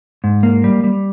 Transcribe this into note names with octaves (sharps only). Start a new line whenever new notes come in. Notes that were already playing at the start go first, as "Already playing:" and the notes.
G#2
A#3
G3
G3